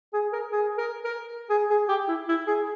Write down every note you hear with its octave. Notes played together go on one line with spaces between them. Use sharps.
G#4
A#4
G#4
A#4
A#4
G#4
G#4
G4
E4
E4
G#4